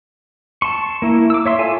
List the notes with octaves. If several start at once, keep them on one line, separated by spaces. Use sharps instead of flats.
A5 C6 C#6
A#3 E4
D6 E6
C#5 E5 C6
F4 A4 F5 G#5 A5